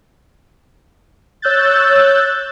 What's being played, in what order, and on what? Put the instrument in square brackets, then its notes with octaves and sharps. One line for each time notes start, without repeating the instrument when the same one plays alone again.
[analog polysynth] C#5 E6 F#6 G6 A6